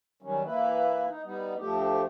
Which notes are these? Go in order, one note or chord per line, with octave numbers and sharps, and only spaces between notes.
D#3 F#3 G3 C#4
E3 A#3 E4 B4
D#4
G3 B3 D#4
D2 F3 A3 G4